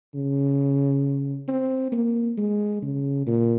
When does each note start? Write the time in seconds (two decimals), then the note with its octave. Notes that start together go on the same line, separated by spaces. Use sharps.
0.15 C#3
1.48 C4
1.92 A#3
2.37 G#3
2.82 C#3
3.26 A#2